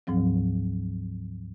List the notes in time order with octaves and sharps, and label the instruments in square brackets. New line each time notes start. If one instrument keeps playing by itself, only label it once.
[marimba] D2 G#2 F3 F#3 C4